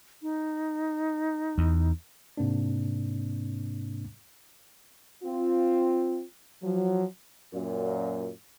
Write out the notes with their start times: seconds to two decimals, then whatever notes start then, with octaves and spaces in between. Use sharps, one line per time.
0.22 D#4
1.58 E2
2.37 G#2 C3 A#3 C4 D4
5.24 C4 F4
6.63 F3 F#3
7.54 F#2 A#2